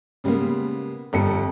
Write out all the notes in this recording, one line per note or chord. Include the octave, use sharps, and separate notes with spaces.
C#3 G3 G#3 A#3 B3
G1 F2 G3 A4 C#7